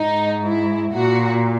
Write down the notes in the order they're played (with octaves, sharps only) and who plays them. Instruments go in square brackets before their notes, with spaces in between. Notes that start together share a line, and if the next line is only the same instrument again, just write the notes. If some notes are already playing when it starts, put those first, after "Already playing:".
Already playing: [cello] G#2 [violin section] D#4
[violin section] E4
[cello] A#2 [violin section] F#4